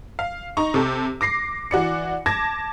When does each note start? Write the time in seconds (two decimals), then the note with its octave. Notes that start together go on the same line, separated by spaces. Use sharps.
0.19 F5
0.57 D#4 A#5 C#6
0.74 C3 G4 A4
1.21 D6 A#6 C7
1.71 E3 F#4 D5 C#7
2.26 A5 D6 G#6 A#6